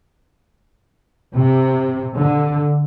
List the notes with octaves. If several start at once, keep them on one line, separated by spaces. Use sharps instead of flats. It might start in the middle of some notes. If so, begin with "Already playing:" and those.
C3
D3